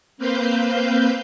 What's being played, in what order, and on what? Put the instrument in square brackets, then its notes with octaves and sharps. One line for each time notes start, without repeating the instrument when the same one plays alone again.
[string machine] A#3 C4 B4 C5 F5 G6